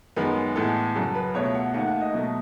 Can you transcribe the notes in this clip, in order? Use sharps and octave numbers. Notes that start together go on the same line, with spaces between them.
F#2 D#3 G#3 B3 B4
A2 E3 G#3 B3 A4
F#2 C#3 F#3 A4
B4
C#2 B2 A3 C#5
F#5
D#2 D#3 A3 F#5
F#5
D#5
B2 F#3 A3